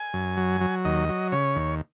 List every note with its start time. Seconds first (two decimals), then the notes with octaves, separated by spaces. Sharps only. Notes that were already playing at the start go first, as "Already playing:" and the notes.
Already playing: G#5
0.14 F#2
0.37 F#3
0.61 F#3
0.85 D#2 D#5
1.09 F#3
1.32 C#3 C#5
1.56 D#2